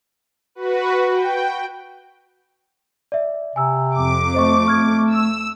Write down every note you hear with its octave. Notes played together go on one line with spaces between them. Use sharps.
F#4 B4
G5
D5 E5
C3 G#5 E6
F2 D6
A3 C5 D#5 C#6
C#6 F6 G#6
E6